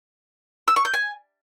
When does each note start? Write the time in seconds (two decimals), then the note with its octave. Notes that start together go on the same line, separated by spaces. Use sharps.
0.68 E6
0.76 C#6
0.85 G6
0.94 G#5